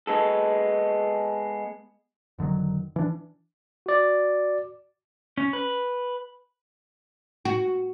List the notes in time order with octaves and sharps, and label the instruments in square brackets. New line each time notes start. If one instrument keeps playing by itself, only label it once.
[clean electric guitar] G#3 B3 A4
[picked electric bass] F1 D3 D#3 F#3
E3 D4
[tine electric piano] F#4 D5
[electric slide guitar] C#4
B4
[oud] F#4